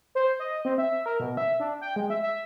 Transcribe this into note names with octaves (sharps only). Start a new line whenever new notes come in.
C5
D#5
C4
E5
A#4
B2
E5
D4
G5
G#3
E5
E5